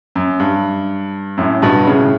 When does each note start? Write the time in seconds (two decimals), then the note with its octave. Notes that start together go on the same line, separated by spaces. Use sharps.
0.15 F#2
0.40 G2
1.37 F#2 A2
1.62 G2 B2
1.87 A2 C#3